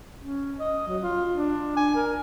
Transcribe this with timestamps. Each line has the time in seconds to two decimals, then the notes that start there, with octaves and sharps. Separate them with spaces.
0.19 C#4
0.60 D#5
0.87 F#3
1.03 F4
1.34 D4
1.76 G#5
1.95 A#4